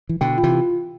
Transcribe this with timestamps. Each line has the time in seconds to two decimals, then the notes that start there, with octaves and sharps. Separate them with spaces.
0.09 E3
0.21 B2 D3 G5
0.38 F4
0.43 C3 E3